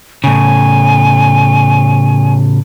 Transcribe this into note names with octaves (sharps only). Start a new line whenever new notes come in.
A2 C#3 G#5